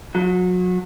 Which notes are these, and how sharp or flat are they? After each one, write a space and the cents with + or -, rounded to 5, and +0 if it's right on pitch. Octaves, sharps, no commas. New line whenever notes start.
F#3 -30